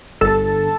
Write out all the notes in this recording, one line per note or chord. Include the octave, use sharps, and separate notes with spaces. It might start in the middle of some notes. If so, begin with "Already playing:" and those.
G1 A4 A5